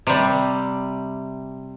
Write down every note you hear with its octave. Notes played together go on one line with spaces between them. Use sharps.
C3 G3